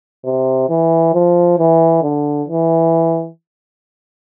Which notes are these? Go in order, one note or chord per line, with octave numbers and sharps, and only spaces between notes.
C3
E3
F3
E3
D3
E3